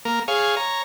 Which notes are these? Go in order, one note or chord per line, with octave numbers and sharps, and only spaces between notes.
A#3 A#4
G#4 C#5 F5
C#5 A#5